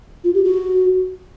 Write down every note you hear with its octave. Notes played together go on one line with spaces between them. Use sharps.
F4
G4
F#4